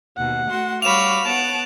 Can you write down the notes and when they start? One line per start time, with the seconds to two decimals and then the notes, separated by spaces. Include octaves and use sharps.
0.17 D#2 B2 F#5
0.48 A3 F#4 C6
0.82 G3 F#4 C#5 F5 B5 D6 E7 F7
1.26 B3 C#5 F#5 A5 D7